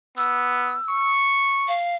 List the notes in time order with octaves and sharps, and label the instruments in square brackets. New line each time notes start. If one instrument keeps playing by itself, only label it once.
[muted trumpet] B3 [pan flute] E6
[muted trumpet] C#6
[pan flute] F5